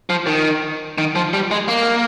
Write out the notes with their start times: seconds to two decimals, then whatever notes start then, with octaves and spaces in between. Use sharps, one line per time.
0.10 F3
0.27 D#3
0.98 D#3
1.15 F3
1.33 G3
1.51 G#3
1.68 A#3